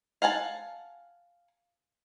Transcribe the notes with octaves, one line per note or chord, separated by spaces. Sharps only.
F5 F#5 G#5 A5